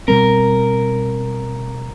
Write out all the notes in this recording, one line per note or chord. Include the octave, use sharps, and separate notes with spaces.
B2 G3 C4 A#4